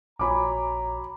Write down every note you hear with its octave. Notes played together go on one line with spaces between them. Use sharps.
A#1 F#4 C#5 G#5 A#5 B5 D6